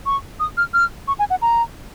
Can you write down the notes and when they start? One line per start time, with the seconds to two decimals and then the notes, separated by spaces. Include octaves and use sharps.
0.06 C#6
0.40 D#6
0.57 F6
0.74 F6
1.08 C#6
1.19 G#5
1.30 F#5
1.42 A#5